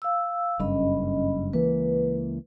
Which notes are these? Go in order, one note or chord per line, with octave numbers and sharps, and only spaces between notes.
F5 E6
F#1 G2 C#4 D#5 B5
C#2 E3 A#3 B4